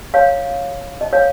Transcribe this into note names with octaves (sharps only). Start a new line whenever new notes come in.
C#5 F5
D#5
C#5 F5